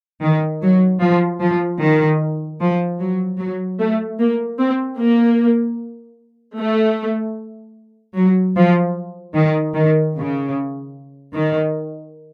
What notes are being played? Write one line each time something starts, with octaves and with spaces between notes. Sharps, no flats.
D#3
F#3
F3
F3
D#3
F3
F#3
F#3
A3
A#3
C4
A#3
A3
F#3
F3
D#3
D#3
C#3
D#3